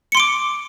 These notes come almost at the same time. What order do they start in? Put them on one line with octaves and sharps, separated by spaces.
C#7 C6 D7 D6